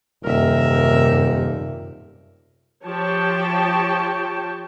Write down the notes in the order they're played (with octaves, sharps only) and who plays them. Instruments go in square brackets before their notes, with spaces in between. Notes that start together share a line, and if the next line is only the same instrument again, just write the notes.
[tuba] D#1 [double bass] F#2 C3 [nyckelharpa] A#4 E5
[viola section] F3 G4 C#5 G5 A5